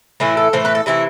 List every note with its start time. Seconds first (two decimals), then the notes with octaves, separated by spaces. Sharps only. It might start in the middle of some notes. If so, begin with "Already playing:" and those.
0.20 A2 E3 A3 E4
0.37 A4
0.53 A2 E3 A3 C5
0.65 B4
0.75 A4
0.86 C3 E3 A3 E4